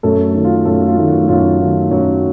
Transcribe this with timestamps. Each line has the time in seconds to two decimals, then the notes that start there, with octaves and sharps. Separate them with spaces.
0.03 F#2 A3 A4
0.34 D#3 A3
0.44 F4
0.65 F#2 A3 A4
0.87 F4
0.97 D#3 A3
1.07 F#3 F#4
1.29 F#2 F4
1.59 D#3 A3
1.91 F#2 F#3 F#4